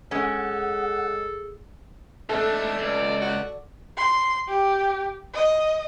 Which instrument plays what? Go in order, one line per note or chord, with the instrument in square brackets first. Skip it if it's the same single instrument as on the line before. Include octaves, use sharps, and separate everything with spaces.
[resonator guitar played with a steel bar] G#3 C#4 [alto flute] G#4 [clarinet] A4 [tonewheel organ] F#5
[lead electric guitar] G#2 D4 [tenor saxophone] A3 [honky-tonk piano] A4
[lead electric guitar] C#2 [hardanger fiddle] D5
[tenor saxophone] F#4
[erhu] C6
G4
D#5